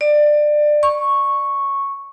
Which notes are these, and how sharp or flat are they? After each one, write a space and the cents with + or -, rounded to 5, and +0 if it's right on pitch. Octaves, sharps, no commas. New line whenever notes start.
D5 +20
C#6 -5